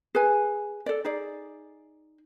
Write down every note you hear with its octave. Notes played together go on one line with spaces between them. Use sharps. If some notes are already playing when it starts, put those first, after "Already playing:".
G#4 B4 G#5
A4 D5
D#4 G#4 D5